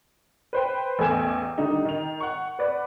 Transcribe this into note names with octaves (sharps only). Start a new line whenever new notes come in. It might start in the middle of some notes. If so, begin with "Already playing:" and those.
B4 C5 G5
A1 E2 A3 G#5 D6 E7
D3 D#3 G3 D4 D#4
D#3 F7
F#5 C#6
B4 D5 F#5